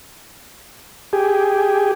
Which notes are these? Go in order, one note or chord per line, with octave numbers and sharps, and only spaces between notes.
G4 G#4